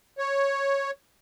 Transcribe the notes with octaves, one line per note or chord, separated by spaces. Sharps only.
C#5